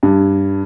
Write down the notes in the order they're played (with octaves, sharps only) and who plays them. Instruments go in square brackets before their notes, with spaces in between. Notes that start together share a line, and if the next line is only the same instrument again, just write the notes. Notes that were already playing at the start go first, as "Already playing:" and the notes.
[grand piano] G2